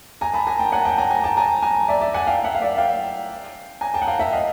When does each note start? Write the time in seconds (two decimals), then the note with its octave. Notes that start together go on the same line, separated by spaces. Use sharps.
0.21 G#5 A#5
0.34 A5 B5
0.47 G#5 A#5
0.59 G5 A5
0.72 F#5 G#5
0.85 G5 A5
0.98 G#5 A#5
1.11 G#5 A#5
1.24 G5 A5
1.37 G#5 A#5
1.62 G#5 A#5
1.88 D5 E5
2.01 D5 E5
2.14 F#5 G#5
2.27 F5 G5
2.44 E5 F#5
2.55 F5
2.61 D5 E5
2.78 F5 G5
3.81 G#5 A#5
3.94 G5 A5
4.02 F#5
4.07 F5 G5
4.19 E5 F#5
4.32 D#5 F5